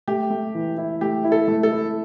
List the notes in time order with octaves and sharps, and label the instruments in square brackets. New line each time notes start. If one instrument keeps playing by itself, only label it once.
[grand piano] A3 [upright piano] G4
[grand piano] A3
E3
E4
[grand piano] A3 [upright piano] G4
[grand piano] E4
[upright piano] A4
[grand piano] A3
[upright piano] A4
[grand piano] E4